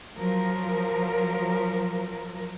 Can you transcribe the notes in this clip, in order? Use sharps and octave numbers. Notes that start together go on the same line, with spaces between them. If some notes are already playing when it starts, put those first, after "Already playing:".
F3 F#3 A#4